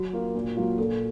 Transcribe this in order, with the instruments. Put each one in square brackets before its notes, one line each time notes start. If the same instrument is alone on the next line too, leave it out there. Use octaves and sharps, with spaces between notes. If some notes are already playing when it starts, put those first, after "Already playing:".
Already playing: [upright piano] F#3 [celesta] F#4
[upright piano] A#3 F4
A#2
F#3 A#3 F4
[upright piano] A#2 [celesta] A4